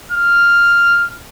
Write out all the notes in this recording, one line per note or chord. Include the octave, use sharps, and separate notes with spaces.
F6